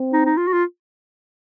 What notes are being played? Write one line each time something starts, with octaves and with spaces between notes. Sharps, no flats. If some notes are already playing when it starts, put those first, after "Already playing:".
Already playing: C4
D#4
D#4
F4
F#4
F4